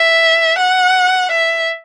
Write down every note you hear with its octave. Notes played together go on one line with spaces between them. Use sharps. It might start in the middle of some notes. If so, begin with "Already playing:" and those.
Already playing: E5
F#5
E5